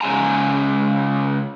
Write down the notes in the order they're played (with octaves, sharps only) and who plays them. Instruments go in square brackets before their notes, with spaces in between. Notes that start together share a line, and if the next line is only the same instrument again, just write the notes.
[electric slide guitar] C#3 G#3 G#5 A#5